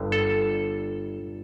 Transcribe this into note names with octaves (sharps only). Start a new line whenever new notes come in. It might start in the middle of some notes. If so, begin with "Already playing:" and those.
Already playing: G1 G2 D3
A4